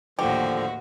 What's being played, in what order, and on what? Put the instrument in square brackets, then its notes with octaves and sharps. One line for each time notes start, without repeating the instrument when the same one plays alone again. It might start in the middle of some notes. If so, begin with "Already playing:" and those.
[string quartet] D#2 A2 F#4 [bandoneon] D3 F3 [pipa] G4